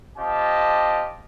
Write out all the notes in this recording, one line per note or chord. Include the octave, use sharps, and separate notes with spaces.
C4 F4 G4 D#5 A5